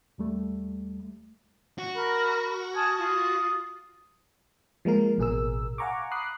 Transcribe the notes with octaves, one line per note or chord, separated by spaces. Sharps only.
D#2 G3 A3
F#4
A#4 B5
G#5 A5 D#6 F6
F4 D#6
F3 G#3 A#3 A#4
A1 B2 G#4 A#4 E6
F5 F#5 G#5 A#5 C#6 D6
A#5 B5 D6 D#6 F#6 C7